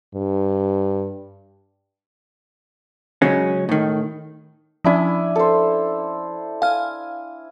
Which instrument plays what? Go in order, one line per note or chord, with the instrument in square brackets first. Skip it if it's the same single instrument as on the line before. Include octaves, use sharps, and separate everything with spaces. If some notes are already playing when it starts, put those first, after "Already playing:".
[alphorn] G2
[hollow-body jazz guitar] C#3 F#3 G#3 C#4
A2 D#3
[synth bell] F3 C#4 [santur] D4 E4 G#5
[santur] A4 C5
[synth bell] F5 F6 [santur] G#5